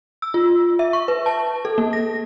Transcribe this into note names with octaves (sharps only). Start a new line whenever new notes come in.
E6
F4
E5
C#6
B4
A5
A4
A#3
A#6